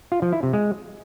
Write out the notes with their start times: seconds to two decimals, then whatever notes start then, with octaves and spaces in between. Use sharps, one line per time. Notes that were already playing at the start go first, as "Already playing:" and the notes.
0.12 F4
0.22 F3
0.33 E4
0.43 C3
0.53 G#3